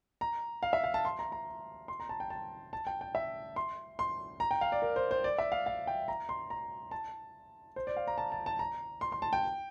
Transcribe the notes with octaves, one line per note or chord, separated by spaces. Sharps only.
A#5
F5
E5
F5
A5
C6
A#5
A#5
C6
A#5
A5
G5
A5
A5
G5
G5
E5
C6
C6
A#5
G5
F5
D5
A#4
C5
C5
D5
E5
F5
F5
G5
A#5
C6
A#5
A5
C5
D5
F5
A#5
A5
A5
A5
A#5
C6
C6
A5
G5